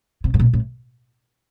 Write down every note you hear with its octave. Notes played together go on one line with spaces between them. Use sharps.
C3
A2
A#2
A2